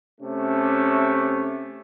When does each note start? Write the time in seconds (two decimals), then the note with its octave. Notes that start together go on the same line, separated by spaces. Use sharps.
0.21 C3 A3 C#4